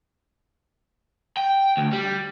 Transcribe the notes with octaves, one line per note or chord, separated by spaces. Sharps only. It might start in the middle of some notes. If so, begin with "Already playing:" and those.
G5
D2
G3